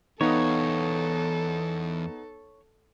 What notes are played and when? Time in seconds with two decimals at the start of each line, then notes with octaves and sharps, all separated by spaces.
0.21 E2 B3 D#4 A4 C#5 F5